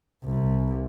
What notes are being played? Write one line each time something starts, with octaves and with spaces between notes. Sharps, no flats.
C2